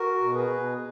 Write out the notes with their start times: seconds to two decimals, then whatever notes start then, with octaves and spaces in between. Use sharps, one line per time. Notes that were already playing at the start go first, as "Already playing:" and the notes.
Already playing: F#4 A#4
0.21 B2
0.34 G#4 B4
0.50 B2